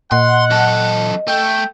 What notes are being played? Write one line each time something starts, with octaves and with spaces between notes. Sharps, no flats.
A#2 D#5 F#5 C6
F#2 A4
A3 G5